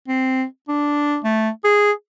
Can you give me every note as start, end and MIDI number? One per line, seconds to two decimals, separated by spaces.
0.08 0.44 60
0.68 1.18 62
1.24 1.50 57
1.64 1.92 68